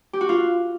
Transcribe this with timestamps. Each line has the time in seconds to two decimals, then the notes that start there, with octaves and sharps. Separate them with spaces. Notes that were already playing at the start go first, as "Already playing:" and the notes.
0.13 G4
0.21 F#4
0.29 F4